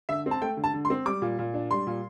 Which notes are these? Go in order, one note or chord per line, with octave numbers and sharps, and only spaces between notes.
D3 E5
C4
A5
A3 G5
D3
A5
D3
C6
C4
G3 D6
A#2
A#2
D4
G3 C6
A#2